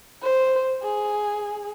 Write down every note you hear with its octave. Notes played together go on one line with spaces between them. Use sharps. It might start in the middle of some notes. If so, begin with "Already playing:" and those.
C5
G#4